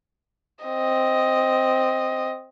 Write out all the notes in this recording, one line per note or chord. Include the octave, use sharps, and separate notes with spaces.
C4 D#5